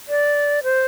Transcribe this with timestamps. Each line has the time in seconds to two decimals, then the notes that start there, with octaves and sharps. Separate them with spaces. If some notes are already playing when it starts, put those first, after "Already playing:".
0.09 D5
0.64 C5